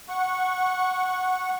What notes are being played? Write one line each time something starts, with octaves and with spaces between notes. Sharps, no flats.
F#5 C#6